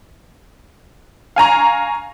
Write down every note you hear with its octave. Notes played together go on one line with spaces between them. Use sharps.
F5 G#5 A#5 C#6